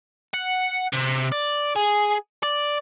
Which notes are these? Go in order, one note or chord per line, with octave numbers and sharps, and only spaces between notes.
F#5
C3
D5
G#4
D5